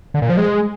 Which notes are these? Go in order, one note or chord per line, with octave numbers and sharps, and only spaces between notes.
D3
A#2
F3
G#3